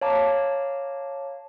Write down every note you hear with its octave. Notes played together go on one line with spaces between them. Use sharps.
C#5 F5 A5 A#5 D6